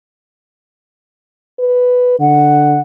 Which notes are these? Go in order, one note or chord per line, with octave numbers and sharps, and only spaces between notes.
B4
D3 F#5